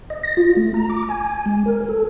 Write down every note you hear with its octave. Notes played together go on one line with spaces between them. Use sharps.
D#5
A#6
F4
A3
A#5
D6
G#5
G#3
A#4
A4